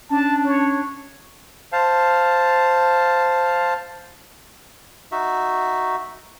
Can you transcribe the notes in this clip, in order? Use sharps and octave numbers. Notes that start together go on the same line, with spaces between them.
C#4 D4 A5
C#5
C5 F5 A5
D#4 F#4 E5